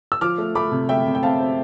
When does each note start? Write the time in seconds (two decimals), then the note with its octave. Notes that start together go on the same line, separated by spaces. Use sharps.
0.12 E6
0.21 F3 D6 F6
0.38 A3
0.55 A3 B5 D6
0.72 C3
0.89 A3 E5 G5
1.06 C3
1.15 G5
1.23 C4 F5 A5
1.40 C4